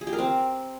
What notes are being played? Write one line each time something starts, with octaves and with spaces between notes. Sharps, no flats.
G#4
G4
A#4
C4